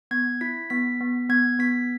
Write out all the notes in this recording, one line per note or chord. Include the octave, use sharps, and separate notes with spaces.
B3 G#6
E4 B6
B3 B6
B3
B3 G#6
B3 B6